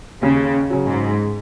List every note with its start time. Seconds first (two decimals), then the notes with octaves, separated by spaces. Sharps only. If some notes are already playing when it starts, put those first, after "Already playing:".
0.23 D#2 C#3
0.70 C#3 F#3
0.87 G#2